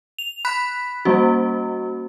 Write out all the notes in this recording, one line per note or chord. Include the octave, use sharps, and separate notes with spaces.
F7
B5 F#6 B6
G3 A#3 C#4 F#4